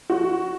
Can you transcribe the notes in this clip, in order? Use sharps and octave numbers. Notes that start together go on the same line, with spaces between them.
F#4